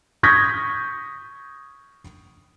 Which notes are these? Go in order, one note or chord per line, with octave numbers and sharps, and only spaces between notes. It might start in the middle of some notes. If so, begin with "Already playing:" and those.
C#6 D#6 G6 G#6 A#6 B6